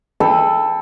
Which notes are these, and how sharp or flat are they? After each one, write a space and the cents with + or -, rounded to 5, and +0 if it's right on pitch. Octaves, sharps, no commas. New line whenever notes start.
A4 +0 G5 +30 B5 +0